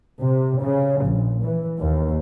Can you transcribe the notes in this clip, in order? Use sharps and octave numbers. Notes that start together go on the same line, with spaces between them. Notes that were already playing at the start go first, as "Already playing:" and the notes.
C3
C#3
A#1
E3
D#2